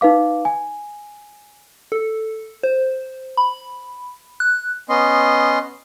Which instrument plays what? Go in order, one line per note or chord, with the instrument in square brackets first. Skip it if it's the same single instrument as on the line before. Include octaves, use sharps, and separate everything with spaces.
[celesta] D#4 B4 F5 D6
G#5
[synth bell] A4
C5
B5
F#6
[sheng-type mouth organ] B3 C#4 D#5 C6